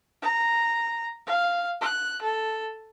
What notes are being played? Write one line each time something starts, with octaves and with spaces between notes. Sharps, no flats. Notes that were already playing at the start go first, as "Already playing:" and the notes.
A#5
F5
F#6
A4